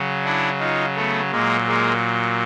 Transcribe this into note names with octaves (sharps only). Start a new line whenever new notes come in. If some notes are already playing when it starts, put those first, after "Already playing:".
Already playing: C#3 F#3
D4 E4
D#4 F4
A3 B3
A#2 F#3 G#3 A#3
G#3 A#3